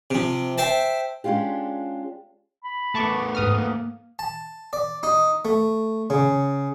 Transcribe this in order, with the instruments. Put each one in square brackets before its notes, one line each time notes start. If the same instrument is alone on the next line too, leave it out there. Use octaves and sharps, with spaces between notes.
[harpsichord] C3 F3
C5 E5 G5 A5
[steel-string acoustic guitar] G#3 C#4 D4 F4 G4
[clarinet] B5
[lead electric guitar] A3 B3 [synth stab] A5 C#6 D6
[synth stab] G#2 D#6 F6 [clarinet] B4
[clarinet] A#3
[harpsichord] A5
D5
D#4
A3
C#3